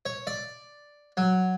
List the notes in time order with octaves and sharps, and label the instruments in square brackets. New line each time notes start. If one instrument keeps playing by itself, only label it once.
[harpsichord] C#5
D5
F#3